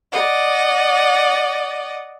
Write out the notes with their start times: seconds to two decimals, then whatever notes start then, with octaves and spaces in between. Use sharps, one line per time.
0.11 D5 D#5 F#5